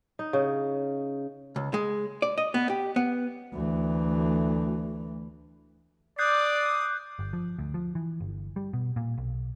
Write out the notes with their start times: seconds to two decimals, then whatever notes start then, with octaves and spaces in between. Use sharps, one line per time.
0.19 D#4
0.33 C#3
1.56 C#2
1.74 G#3
2.22 D5
2.38 D#5
2.54 B3
2.70 G4
2.96 B3
3.54 D2 E3
6.19 D5 D6 D#6 F#6 G6 C7
7.19 G1
7.33 F3
7.59 D2
7.74 F3
7.95 E3
8.20 G1
8.56 G3
8.73 B2
8.96 A#2
9.18 B1